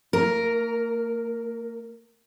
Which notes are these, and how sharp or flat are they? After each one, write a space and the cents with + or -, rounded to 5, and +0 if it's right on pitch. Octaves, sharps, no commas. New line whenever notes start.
A#3 -40 A#4 +0